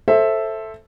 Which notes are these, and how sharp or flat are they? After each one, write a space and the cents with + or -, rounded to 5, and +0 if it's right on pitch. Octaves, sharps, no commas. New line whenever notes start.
A4 +0 C5 +20 E5 +0